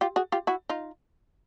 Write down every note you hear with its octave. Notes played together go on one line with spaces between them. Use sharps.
F4 G4
F#4 G#4
F4 G4
E4 F#4
D#4 F4